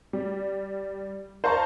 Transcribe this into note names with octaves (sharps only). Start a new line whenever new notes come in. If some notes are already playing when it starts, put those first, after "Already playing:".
G3
C5 F5 A5 A#5 C#6